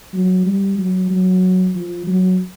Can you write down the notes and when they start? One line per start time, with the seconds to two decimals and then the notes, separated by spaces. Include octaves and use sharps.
0.13 F#3
0.46 G3
0.78 F#3
1.11 F#3
1.75 F3
2.07 F#3